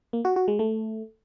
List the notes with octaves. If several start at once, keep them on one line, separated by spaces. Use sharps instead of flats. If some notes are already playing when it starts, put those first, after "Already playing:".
A#3
F#4
F#4
G#3
A3